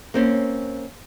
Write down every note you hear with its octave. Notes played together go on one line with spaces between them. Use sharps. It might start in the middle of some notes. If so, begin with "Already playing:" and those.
A#3 C4 C#4